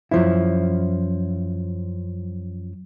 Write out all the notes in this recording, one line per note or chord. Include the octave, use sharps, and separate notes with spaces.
F#2 F3 E4